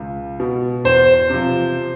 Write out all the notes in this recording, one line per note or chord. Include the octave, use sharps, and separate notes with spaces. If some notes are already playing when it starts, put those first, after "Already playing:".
Already playing: C#2
B2
E2 C5
C3 F3